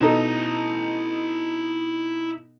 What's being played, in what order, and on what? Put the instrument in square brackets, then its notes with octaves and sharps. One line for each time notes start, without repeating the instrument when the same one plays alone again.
[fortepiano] B2 D#4 A4 [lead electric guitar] E4 A#5